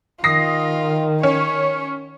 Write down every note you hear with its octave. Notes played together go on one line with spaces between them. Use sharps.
D#3 F4 D#6 A#6 C7
C#4 C#5